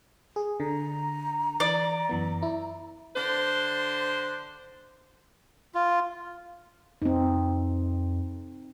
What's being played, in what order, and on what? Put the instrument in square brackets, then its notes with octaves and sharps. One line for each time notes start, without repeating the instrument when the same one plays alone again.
[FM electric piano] G#4
[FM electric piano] D3 [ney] A#5
[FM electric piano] E3 [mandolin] D5
[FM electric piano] F#2 E3 B3
E4
[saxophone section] D3 D4 C5
[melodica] F4
[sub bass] F2 [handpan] C4 D#4